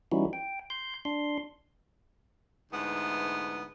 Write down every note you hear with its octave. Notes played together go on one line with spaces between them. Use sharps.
E3 G3 C#4 D#4 E4 F#4
G5
C6 G6
D4 C6
D2 G#2 E3 B3